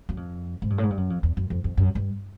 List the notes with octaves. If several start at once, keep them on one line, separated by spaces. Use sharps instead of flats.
F#2
F2
G#2
G2
A2
G#2
G2
F#2
F2
E2
F#2
F2
F2
F#2
G2